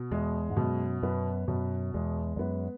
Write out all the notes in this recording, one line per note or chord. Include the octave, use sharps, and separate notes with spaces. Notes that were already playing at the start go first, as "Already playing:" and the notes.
Already playing: B2
E2 G#3
G#2
F#2 B2
F#2 B3
F#2 B2
E2 G#3
E2
F#2 B3